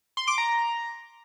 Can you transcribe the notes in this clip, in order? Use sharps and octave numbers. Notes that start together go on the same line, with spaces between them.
C6
D6
A#5